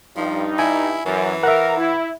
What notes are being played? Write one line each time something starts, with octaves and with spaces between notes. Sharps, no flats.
G2 F3 D#4
E4 G#5
F#2 E3
A#4 E5 F#5
E4